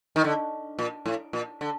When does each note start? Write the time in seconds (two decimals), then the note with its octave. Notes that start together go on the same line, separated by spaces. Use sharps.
0.16 D#3
0.24 D3
0.79 A#2
1.06 A2
1.33 A#2
1.61 D3